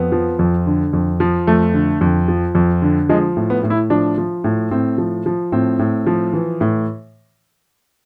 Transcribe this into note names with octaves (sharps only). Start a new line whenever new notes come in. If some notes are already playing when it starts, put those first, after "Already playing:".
Already playing: F2 B3
F3
F2
D3
F2
F3
F2 A3
D3
F2
F3
F2
D3
F3 G#3
A2
B3
A2
E4
F3 D4
F3
A2
A2 C4
F3
F3
A2 C4
A2
F3
E3
A2